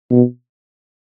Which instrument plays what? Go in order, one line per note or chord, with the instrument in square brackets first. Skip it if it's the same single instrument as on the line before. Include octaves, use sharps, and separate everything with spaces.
[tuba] B2